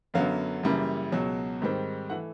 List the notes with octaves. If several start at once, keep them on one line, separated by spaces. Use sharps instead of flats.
F#2 D3 F#3 B3 F5
F#2 C#3 E3 G3 A#3
C#2 B2 F#3
G#2 D#3 G3 C4
E3 A3 F#5